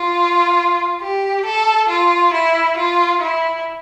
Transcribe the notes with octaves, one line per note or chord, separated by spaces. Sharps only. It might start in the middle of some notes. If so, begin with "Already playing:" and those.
Already playing: F4
G4
A4
F4
E4
F4
E4